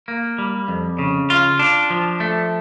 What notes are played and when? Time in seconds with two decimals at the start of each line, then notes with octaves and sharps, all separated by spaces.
0.08 A#3
0.38 G3
0.68 F2
0.99 C#3
1.30 F4
1.59 D4
1.90 F3
2.20 A3